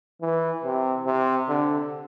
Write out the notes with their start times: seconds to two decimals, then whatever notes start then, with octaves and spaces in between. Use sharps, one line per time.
0.22 E3
0.64 C3
1.06 C3
1.49 D3